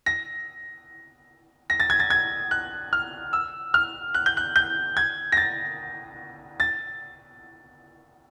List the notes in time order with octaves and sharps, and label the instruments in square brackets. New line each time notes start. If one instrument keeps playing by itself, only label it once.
[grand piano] A#6
A#6
A6
G#6
A6
G#6
F#6
F6
E6
F6
F#6
G6
F#6
G6
G#6
A#6
A6
A6